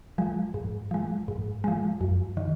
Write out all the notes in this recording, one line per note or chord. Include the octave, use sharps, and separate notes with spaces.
F3 G#3
G#2
F3 G#3
G#2
F3 G#3
F#2
D#3